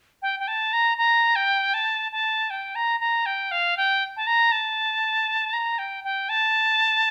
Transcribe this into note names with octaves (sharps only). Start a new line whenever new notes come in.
G5
G5
A5
A#5
A#5
G5
A5
A5
G5
A#5
A#5
G5
F5
G5
A5
A#5
A5
A#5
G5
G5
A5